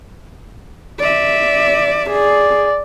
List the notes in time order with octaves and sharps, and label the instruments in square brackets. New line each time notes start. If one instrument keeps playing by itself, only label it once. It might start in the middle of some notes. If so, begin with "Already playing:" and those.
[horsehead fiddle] D5 E5
[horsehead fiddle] G#4 [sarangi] D5